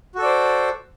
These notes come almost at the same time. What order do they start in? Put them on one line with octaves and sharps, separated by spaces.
F#4 A4 D5 C5